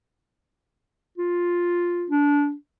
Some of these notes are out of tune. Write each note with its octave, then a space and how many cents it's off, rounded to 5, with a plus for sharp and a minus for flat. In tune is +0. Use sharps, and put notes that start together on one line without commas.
F4 +5
D4 -20